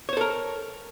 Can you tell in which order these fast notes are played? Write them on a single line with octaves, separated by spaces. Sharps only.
C#5 C5 A4 A#4